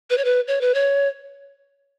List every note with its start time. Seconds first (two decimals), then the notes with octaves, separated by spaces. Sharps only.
0.10 B4
0.18 C#5
0.25 B4
0.48 C#5
0.61 B4
0.74 C#5